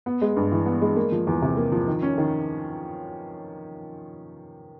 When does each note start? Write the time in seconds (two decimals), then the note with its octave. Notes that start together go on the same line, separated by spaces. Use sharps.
0.06 B3
0.22 G#3
0.37 G2
0.52 E3
0.66 B3
0.82 G#3
0.96 A#3
1.12 F3
1.27 E2
1.42 C3
1.57 A#3
1.72 F3
1.87 D#3
2.02 C#4
2.18 D#3